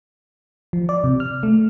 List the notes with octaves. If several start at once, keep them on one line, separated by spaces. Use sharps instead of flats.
F3
D5
C3
F6
A3